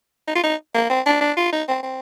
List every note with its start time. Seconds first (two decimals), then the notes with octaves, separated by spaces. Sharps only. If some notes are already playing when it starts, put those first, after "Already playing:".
0.27 D#4
0.35 F4
0.44 D#4
0.75 A#3
0.90 C4
1.06 D4
1.21 D4
1.37 F4
1.52 D#4
1.68 C4
1.83 C4